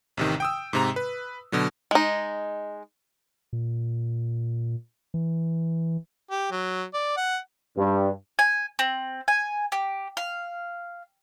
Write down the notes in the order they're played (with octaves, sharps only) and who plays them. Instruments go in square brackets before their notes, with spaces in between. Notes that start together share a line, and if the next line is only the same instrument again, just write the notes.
[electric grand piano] A1 C3 D#3
G5 D#6 E6
G#2 C3 A#5
B4
B2 D3 F#3
[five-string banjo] G#3 D#4
[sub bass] A#2
E3
[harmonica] G4
F#3
D5
F#5
[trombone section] G2
[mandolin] G#5
C4
G#5
G4
F5